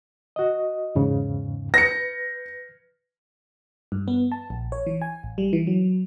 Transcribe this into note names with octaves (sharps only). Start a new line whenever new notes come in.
F#4 D#5
E2 G#2 C#3
B4 A#6 C#7
G2
B3
A5
A#1
C#5
E3
G#5
A1
G3
E3
F#3